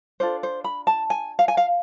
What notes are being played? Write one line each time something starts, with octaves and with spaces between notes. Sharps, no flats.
D4 F4 A4 C5
C5
B5
A5
G#5
F5
G#5
F5